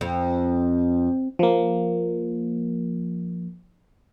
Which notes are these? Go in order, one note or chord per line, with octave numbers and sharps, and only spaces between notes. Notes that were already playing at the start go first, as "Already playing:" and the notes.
F2
F3 A#3